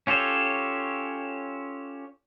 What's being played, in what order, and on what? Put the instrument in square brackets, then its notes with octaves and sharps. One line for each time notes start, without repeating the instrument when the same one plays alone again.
[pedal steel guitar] C#4 F4 G4 A4 C#5